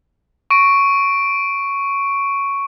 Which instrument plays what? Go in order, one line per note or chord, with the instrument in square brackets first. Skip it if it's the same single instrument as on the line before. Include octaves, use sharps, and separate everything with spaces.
[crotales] C#6 D7